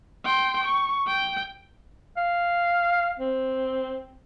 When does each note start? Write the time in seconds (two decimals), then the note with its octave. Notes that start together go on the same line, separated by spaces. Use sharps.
0.25 G5 C6
0.64 C#6
1.07 G5
2.17 F5
3.19 C4